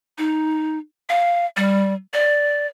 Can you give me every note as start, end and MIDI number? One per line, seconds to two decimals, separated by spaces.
0.18 0.78 63
1.09 1.45 77
1.57 1.94 55
2.14 2.67 74